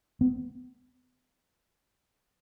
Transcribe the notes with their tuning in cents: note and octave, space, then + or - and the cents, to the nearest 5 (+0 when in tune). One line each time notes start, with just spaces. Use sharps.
B3 +40